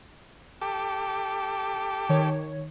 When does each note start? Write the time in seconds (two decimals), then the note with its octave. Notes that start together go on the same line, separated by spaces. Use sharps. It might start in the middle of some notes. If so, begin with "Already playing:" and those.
0.62 G4 A4 D6
2.09 D#3 C#5